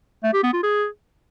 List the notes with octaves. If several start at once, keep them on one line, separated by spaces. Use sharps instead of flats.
A3
G4
B3
F4
G#4